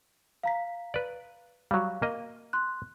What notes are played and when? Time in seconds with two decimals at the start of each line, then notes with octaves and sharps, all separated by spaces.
0.43 F5 A#5 B6
0.94 B4 D5
1.71 F#3 G3 F5
2.02 A#3 D#5
2.53 C6 F#6